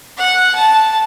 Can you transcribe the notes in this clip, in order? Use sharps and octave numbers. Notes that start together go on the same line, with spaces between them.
F#5
A5